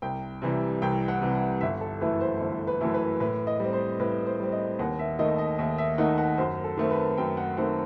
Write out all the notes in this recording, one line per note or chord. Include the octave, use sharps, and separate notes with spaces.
C2 G5
C3 E3 G3
C2 G5
F#5
C3 E3 G3
F#5
G1 E5
A4
F#2 E3 A3 E4 B4
C5
G1 C5
B4
F#2 E3 A3 E4
B4
A2 B4
D#5
G3 C4
C5
A2 B4
C5
G3 C4
D#5
D#2 F#5
E5
D#3 A3 D#4 D#5
D#5
D#2 E5
E5
D#3 A3 D#4 F#5
F#5
F#2 C5
A4
D#3 A3 C4
B4
F#2 G5
F#5
D#3 A3 C4 F#5